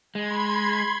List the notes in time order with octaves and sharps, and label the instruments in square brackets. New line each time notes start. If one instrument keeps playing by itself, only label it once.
[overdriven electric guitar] G#3 [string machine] B5 C6 G#6